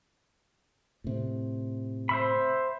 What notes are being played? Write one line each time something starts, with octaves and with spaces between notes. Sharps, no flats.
A2 C3
C5 E5 B5